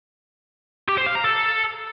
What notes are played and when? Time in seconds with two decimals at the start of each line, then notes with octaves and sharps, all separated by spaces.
0.89 G4
0.98 C5
1.07 F5
1.15 A#5
1.24 A4